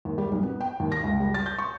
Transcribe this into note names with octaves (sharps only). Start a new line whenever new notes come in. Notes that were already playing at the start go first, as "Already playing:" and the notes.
D#2
G3
B1
B3
G5
D#2
A#6
C#2
G3
A6
G6
C#6